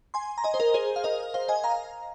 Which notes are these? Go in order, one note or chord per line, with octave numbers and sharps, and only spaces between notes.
G#5 C6
A#5
D#5 G#5
C5
A#4 D#5
G#4 C5
F5
A#4 D#5
C5 F5
D#5 G#5
F5 A#5